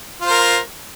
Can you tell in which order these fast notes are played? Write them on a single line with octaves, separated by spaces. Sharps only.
F4 C5 A#4